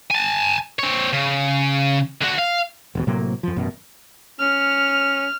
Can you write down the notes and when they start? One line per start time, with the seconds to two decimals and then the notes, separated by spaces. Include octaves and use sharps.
0.11 G#5 A5
0.79 C4 C#5
1.13 C#3
2.22 D3 F#4
2.39 F5
2.95 E1 D#2 B2
3.07 A2 C3 F#3 A#3
3.43 F2 F3
3.56 A1 F#2 B2
4.40 C#4 F6